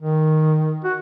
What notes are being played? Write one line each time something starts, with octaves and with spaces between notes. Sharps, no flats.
D#3
F#4